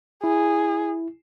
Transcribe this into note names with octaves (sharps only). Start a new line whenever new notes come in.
E4 G#4